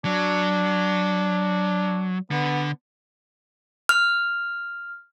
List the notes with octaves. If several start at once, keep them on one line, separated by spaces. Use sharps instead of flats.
F#3 D4
D3 B3
F6